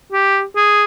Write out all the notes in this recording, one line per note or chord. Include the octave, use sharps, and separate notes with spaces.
G4
G#4